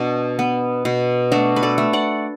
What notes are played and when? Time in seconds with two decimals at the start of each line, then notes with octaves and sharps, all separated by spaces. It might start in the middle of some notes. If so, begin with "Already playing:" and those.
Already playing: B2 D4
0.39 B3
0.85 B2
1.32 A3 D4 F#4
1.56 B4
1.63 A4 D5
1.78 A3
1.93 D5 F#5